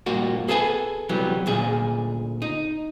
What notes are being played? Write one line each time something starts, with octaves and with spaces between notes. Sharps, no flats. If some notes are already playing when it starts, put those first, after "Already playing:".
G2 A#2 A#3 F#4
G#4 A4 B4 E5 G#5
C3 E3 F#3 G3 B3
D2 A#2 G#4
D#4